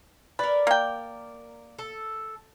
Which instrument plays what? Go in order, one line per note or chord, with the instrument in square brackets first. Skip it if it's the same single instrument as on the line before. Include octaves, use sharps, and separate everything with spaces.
[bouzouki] A#4 D5 [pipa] B4
[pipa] A#3 G5
[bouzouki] A4